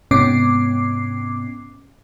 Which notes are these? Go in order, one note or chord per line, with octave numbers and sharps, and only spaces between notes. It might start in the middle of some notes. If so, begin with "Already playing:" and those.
G#2 C3 B3 C#4 D6 C7